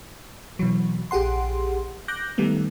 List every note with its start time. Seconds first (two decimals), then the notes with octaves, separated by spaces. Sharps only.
0.59 B2 E3 F#3
1.11 A#1 G4 G#4 F#5 C6
2.08 D6 F#6 G6 A#6
2.38 D#3 G3 A3 B3